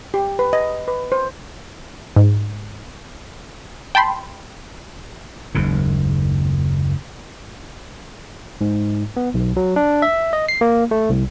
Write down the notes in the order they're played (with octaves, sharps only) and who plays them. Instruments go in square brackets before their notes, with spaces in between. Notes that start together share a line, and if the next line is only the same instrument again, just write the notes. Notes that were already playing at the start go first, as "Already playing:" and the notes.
[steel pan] G4
B4
D#5
B4
C5
[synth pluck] G#2
G5 A5 B5 C6
[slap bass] F#1 D#2 G#2
[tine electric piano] G#2
B3
B1
F#3
D4
E5
D#5
C7
A#3
A3
C2